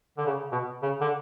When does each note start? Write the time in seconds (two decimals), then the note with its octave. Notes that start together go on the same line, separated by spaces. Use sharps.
0.18 D3
0.26 C#3
0.52 B2
0.83 C#3
1.01 D3